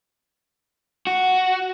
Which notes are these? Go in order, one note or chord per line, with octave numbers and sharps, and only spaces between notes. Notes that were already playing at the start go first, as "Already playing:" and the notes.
F#4